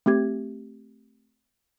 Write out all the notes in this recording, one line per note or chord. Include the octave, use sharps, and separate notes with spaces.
A3 C4 G4 G#6